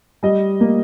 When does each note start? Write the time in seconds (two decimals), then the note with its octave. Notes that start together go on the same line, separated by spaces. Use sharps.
0.23 G3 D#5
0.60 A#3